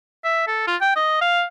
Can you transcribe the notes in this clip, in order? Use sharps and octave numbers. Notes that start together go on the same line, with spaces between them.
E5
A4
F4
G5
D#5
F5